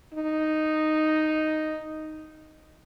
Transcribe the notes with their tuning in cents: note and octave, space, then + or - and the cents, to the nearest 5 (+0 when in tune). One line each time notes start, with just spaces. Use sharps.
D#4 -5